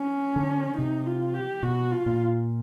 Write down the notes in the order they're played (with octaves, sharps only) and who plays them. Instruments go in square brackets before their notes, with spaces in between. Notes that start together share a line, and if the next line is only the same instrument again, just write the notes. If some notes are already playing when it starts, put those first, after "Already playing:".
Already playing: [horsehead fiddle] C#4
[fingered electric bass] D3
[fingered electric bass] C3 [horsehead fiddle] D#4
[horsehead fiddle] F4
G4
[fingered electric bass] B2 [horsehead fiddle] F#4
[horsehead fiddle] F4
[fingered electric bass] A#2